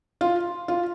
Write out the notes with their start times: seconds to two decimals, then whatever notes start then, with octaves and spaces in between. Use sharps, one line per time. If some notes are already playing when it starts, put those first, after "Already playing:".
0.21 F4
0.68 F4